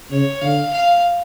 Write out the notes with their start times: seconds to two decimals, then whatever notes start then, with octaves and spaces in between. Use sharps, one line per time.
0.10 C#3 C#5
0.42 D3 F5
0.73 F5